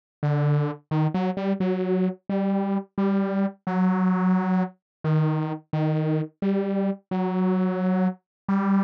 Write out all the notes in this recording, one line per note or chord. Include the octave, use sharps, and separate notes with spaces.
D3
D#3
F#3
G3
F#3
G3
G3
F#3
D#3
D#3
G3
F#3
G3